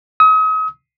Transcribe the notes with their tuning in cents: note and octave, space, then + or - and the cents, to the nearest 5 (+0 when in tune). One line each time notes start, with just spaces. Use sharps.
D#6 +40